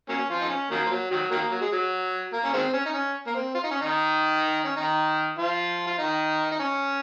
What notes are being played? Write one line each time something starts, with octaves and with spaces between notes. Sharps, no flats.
F#3 A#3 C#4
F3 F4
D#4
C#4
D#3 F#3 A#3
F3
F#3
D#3 F#3
D#3 F#3 A#3
F#3
G#3
F#3
A#3
C#4
D#3 G#3 C4
C#4
D#4
C#4
A#3
C4
F4
D#4
C#4
D#3 D#4
C#4
D#3 D#4
F3 F4
F4
D#3 D#4
D#4
C#4